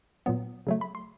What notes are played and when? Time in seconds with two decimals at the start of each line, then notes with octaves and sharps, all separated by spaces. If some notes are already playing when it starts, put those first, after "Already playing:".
0.26 A#2 F#3 B3
0.67 C#3 F#3 A3
0.81 B5
0.95 C6